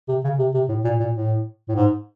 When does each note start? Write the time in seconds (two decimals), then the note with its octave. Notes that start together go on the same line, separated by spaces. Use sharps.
0.08 C3
0.24 C#3
0.39 C3
0.54 C3
0.69 A2
0.84 A#2
1.00 A#2
1.14 A2
1.69 A2
1.75 G#2